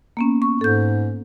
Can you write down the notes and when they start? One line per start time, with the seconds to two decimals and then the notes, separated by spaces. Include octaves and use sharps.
0.17 A#3 B3 C#4
0.42 C#6
0.61 G#2 A4 G6